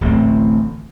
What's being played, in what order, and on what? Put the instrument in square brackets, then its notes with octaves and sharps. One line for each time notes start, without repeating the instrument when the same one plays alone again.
[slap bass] D1 A1 A3 C4